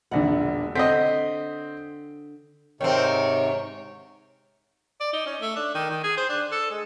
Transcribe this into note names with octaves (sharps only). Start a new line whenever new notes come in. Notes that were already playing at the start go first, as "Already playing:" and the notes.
E1 A#1 D3 F#5
D3 C4 D#5 B6
G#2 C3 D#3 C4 C#5
D5
D#4
C#4
A3
D4
D#3
D#3
G#4
C5
D4
A4
G#3